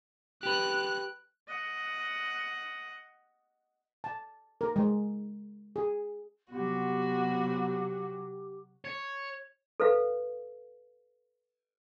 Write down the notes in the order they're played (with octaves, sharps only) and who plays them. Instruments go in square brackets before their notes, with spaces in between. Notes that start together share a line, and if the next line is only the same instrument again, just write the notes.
[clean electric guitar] G4 B4 [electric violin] F#6
[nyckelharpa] D#5 F#5
[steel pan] A5
A#4
G#3
G#4
[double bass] C3 F#3 [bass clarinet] B3 [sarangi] F#4 [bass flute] G4
[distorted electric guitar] C#5
[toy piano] A4 B4 F5